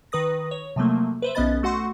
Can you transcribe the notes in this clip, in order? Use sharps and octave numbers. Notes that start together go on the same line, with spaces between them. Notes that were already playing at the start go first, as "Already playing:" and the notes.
D#3 B4 D#6 A#6
C#5
C3 F3 F#3 A3 A#3
B4 C5 E5
B1 B3 C#4 D#5 B5 A6
A3 F#4 F#5 C6 C#6